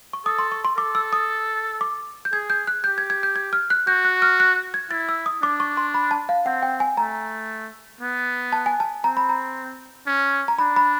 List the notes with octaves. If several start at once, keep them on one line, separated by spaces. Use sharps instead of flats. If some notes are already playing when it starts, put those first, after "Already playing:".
C#6
A4 D#6
C6
C#6
C6
A4 D6
E6
D#6
D6
G6
G#4 G#6
G6
F#6
G4 G6
G#6
G#6
G6
G#6
F6
F#6
F#4 G6
F#6
F6
F#6
G#6
E4 A6
E6
D#6
D4 D6
C#6
C6
B5
A5
F5
C4 F#5
G5
G#5
A3 A#5
B3
A5
G#5
A5
C4 A#5
B5
A#5
C#4
A#5
D4 B5
B5